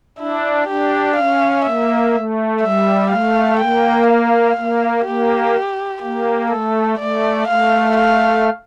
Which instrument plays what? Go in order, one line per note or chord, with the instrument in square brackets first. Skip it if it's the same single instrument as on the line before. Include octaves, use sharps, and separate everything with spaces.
[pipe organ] D4 [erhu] E4
[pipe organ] D4 [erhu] G4
[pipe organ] C#4 [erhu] F5
[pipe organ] A#3 [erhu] E5
[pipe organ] A3
[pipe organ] G3 [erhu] E5
[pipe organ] A3 [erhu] F5
[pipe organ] A#3 [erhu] G5
[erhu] F5
[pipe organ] A#3
[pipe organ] A#3 [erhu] G4
[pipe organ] A#3 [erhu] G4
[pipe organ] A3 [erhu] A4
[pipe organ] A3 [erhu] D5
[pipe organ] A3 [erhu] F5
[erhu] F5